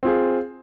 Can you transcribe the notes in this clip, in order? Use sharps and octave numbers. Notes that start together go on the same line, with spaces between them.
C4 F4 G#4